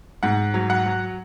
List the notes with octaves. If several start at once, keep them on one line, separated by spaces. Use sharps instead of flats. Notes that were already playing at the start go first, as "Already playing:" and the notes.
G#2 F#5
F#3
F#5
F#3